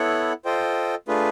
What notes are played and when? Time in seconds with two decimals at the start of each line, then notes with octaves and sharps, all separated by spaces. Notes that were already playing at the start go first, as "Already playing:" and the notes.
Already playing: B3 E4 A4 C#5 F#5
0.45 F4 A4 C5 D#5 G5
1.08 A3 D4 F4 G#4 B4